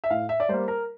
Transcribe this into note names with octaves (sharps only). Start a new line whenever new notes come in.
E5
A2 F5
E5
D5
G3 A#3 C5
A#4